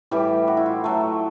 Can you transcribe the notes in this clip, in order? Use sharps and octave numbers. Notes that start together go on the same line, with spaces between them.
A2 E3 G3 G4
F#4
E4
F4
A2 F#3 A3